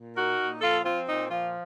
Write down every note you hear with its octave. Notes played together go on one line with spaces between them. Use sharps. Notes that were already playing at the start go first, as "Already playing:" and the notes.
Already playing: A#2
D#4 F#4 A#4
A#2
F3 F4 A4
C4 F4
A#2 D#4
F3 F4